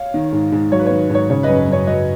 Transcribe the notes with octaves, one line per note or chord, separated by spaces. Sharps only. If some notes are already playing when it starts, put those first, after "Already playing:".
Already playing: C#5 F5
D#3
G#2
G#2
F#3 C#5
B4
D#3 C#5
G#2 C#5
C#3 C#5
F#2 B4 D#5
B4
F#2 C#5
F#3 B4 D#5